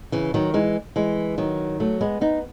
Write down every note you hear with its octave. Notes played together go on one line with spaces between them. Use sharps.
C#3 E3
D#3 F#3
E3 G#3
E3 G#3
D#3 F#3
F#3 A3
G#3 B3
B3 D#4